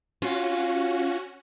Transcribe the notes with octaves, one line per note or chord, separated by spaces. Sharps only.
C#4 F4 F#4